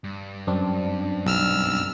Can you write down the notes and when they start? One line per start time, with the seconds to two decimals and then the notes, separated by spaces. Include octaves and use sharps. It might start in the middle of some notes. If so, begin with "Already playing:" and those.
0.04 G2
0.47 F#2 C4 D4
1.26 B1 E6 F6